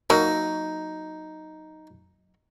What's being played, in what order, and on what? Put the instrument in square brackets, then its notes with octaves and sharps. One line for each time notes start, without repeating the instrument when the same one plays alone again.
[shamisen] F#3 A#3 [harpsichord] D#4